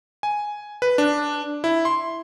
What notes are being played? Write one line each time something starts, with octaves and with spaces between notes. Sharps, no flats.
G#5
B4
D4
E4
C6